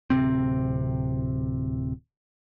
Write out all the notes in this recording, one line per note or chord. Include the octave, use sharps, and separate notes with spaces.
D1 B1 C3 C4